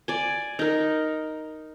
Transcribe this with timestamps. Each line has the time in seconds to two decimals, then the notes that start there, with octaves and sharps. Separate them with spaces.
0.08 D5 G#5
0.59 D#4 A#4